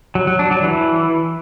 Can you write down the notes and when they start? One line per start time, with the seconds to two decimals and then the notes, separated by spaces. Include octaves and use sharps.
0.15 F#3
0.27 F#3
0.39 D4
0.51 F#3
0.63 E3